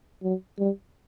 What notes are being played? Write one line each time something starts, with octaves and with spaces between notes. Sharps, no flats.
F#3
G3